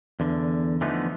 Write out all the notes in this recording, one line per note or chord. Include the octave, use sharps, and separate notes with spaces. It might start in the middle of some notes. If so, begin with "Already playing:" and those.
E2 D3
D3 E3 F3 A3 B3 D#4